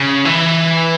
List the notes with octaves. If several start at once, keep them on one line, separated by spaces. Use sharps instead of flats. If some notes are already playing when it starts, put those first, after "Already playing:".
Already playing: C#3
E3